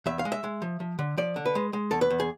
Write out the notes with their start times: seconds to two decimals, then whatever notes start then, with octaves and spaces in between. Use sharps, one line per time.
0.06 E2 E5
0.19 F5
0.25 G#3
0.32 E5
0.44 G#3
0.62 F3
0.80 F3
0.99 D3
1.17 F3 D5
1.36 D3
1.46 B4
1.55 G#3
1.73 G#3
1.91 E2 A4
2.01 B4
2.10 E2
2.20 G#4